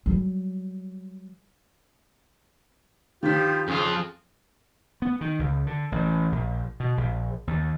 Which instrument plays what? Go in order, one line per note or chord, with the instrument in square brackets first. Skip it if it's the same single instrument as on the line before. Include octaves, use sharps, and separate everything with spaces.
[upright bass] F#3 G3
[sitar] G2 F3 [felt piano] D#3 B6 [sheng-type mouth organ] F4 G4
[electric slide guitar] F2 F4 [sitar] C#3 [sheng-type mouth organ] G#4
[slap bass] B3
D#3
C#2
D3
A1
A#1
B2
A#1
D#2